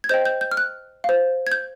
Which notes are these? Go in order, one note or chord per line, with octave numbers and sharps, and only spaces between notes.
G#6
C5 D#5 G5 G6
G6
G6
F6
F#6
C5 F5
G#6
G6